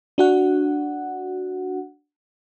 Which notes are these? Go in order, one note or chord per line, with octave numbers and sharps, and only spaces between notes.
D4 F#4 F#5